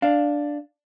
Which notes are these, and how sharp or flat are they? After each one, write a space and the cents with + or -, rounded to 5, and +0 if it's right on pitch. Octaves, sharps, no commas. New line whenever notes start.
D4 +0 F5 +5